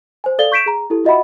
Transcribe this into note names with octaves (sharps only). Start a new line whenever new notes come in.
C5 G#5
A4 D5 F5 A6 G7
C#6 G6 B6 D7 E7
G#4 A#5
E4 G4 A4
F4 F#4 D#5 E5 F#5 B5